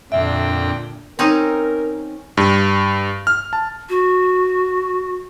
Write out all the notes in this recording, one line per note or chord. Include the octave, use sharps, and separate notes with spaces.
F2 A#2 D3 C4 D4 E5 G5
C4 C#4 D#4 A#4
G2
F6
A5
F#4